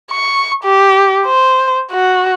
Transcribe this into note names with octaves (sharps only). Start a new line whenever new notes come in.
C#6
G4
C5
F#4